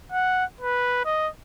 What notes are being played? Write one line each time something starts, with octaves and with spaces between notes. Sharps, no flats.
F#5
B4
D#5